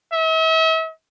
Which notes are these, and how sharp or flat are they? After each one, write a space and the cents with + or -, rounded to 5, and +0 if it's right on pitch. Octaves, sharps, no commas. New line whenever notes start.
E5 -40